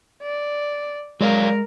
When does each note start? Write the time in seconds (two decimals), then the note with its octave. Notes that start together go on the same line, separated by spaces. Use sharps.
0.22 D5
1.21 F#3 G#3 A#4 D5 F5